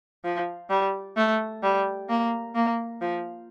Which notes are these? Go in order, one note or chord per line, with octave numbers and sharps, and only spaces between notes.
F3
G3
A3
G3
A#3
A#3
F3